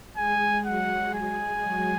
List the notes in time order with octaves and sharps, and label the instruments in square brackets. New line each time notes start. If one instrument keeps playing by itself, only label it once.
[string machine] G#3 G#4 [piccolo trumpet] G#5
[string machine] F#3 F#4 [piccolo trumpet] F#5
[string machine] G#3 G#4 [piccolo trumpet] G#5
[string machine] F#3 F#4